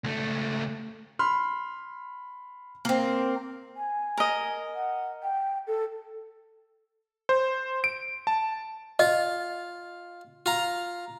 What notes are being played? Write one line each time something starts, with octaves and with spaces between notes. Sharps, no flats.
C#2 A3
B5 C6 F6
A#3 C4
G#5
A#4 D#5
F#5
G5
A4
C5
D7
A5
F4 D#5
F4 A#5